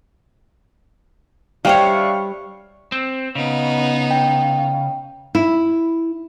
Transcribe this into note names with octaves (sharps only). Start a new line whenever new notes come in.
G3 D4 C5 C#5 E5 F5 G5 C#6
C4
C#3 B3 D#4
G5
E4